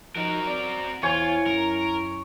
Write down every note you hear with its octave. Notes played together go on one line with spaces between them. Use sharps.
F3 D#4 F#4 A#4
C4 D5
E2 E4 F4 C5 C#5 G#5
F#2 A#4